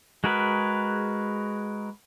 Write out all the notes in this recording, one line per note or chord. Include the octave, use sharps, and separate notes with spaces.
G#3 F#4 G#4 A#4 B4